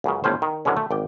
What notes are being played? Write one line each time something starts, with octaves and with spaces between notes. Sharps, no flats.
C#2 F#2 C#3
G1 A2 C#4 C5
D#3
F#2 D3 E3 G#3 C#4
A3
G#1 D5 G5